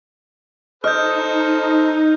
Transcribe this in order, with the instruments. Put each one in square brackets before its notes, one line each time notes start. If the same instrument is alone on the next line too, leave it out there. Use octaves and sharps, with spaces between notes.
[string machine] D#4 [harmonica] A4 C5 [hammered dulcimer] D#5 [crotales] F6 G6